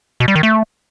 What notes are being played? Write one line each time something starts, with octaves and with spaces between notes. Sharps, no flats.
B2
G3
D#3
A3